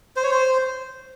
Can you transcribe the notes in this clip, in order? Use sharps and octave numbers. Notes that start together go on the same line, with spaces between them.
C5
C#5
C5